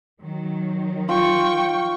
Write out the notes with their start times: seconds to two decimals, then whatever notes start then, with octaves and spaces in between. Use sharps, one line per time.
0.22 D#3 F#3
1.09 F4 G5 C#6